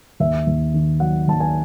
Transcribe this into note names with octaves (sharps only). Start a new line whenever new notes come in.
D#2 E5
D#2
D#3
F#3 F#5
D#2 A5
G#5